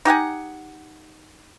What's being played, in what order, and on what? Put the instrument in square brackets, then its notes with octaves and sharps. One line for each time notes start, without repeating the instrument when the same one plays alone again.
[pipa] D#4 G4 F#5 G#5